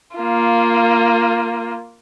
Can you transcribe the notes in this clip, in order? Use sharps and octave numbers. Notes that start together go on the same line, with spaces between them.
A#3 F4